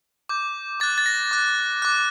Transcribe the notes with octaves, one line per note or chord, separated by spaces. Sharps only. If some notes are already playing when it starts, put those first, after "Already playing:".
D6 G6
D6 F#6 A6
A6
A#6
D6 F#6
D6 F#6